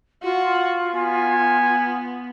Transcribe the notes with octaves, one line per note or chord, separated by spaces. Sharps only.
F4 F#4
B3 G#5